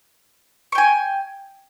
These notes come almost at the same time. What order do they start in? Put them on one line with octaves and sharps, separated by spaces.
C#6 G5 G#5